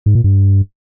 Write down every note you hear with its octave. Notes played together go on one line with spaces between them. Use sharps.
G#2
A#2
G2